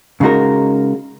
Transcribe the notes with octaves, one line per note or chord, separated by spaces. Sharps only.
C#3 G#3 D#4 F#4 A#4